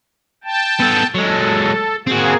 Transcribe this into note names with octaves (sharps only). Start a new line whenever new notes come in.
G5 A5
B3 A4
F#3 G#3 A4
A#3 C4 F#4 G#4